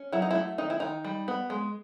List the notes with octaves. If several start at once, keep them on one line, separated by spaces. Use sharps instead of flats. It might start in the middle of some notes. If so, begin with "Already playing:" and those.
Already playing: C#4
F#3 E4
D#4
E4
A3
D#3 D#4
E4
D#3 D#4
G3
B3
G#3